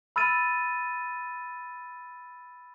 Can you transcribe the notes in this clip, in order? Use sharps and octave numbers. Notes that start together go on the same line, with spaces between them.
B5 E6 F6 A6 D#7